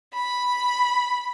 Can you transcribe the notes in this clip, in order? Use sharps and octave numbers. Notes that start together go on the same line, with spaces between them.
B5